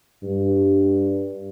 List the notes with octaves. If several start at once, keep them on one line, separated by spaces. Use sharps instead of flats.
G2